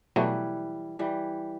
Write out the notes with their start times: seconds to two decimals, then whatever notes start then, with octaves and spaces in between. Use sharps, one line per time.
0.16 B2 E3 F#3 G3 A3
0.99 E3 G3